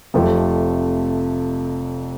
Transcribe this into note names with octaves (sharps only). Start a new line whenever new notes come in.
F1 F2 C3 F3 A3